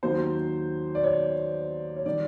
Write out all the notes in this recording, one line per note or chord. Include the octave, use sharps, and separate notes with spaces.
D#2 D#3 F#3 C5
D5
C#5
C#5
D#3 G3 D5